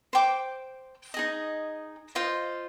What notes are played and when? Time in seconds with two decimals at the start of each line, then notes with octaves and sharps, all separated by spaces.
0.13 C5 G5 D6
1.14 D#4 G#4 D#5
2.15 F4 C5 D#5